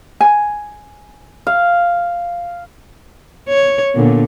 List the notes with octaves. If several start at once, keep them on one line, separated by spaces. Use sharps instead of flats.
G#5
F5
C#5
A#2 D3 B3